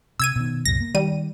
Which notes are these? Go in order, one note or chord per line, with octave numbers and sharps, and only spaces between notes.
C3 E6 G#6 D#7
B2 D#3
C2 F#2 A#2 A#6
A#3
D#3 G3 D#7